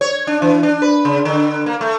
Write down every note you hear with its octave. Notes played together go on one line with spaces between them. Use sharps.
C#5
D4
E3
D4
B4
C#3
D3
A#3
A3